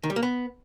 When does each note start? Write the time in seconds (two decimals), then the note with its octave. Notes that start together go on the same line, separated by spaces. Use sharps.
0.03 D#3
0.10 G3
0.16 A#3
0.23 B3